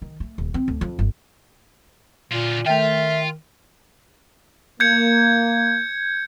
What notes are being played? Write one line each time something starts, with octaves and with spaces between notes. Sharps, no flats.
D#3
A3
D#1
C4
D2
F2
G1
A#2 D3 F4
D#3 A3 F4 E5 G5
A#3 G6 G#6 C#7